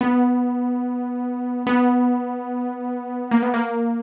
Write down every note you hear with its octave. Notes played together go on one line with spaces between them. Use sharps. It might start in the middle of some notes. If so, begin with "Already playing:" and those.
B3
B3
A#3
B3
A#3